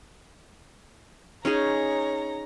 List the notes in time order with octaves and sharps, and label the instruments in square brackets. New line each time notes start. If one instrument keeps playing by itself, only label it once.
[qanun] C#4 D#4 G#4 [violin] C#5 A#5